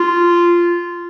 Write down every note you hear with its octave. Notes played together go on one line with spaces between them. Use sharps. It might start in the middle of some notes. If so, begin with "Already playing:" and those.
Already playing: F4